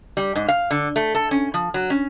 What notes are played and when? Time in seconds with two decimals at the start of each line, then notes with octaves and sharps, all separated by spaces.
0.17 G3
0.35 G#2
0.48 F5
0.71 D3
0.96 A3
1.14 A4
1.31 C#4
1.54 F3
1.74 F#3
1.90 C#4